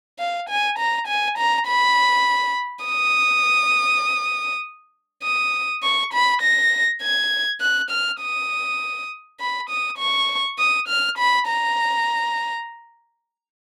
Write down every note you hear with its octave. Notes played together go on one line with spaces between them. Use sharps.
F5
G#5
A#5
G#5
A#5
B5
D#6
D#6
C#6
B5
A#6
G#6
F#6
F6
D#6
B5
D#6
C#6
D#6
F6
B5
A#5